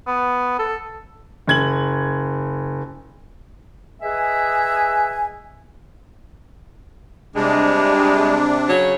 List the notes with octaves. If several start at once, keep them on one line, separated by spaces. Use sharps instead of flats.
B3
A4
F#1 G#6 F#7
G#4 B4 D#5 E5 G#5
C3 G3 G#3 D4
C#3 F#3 C#5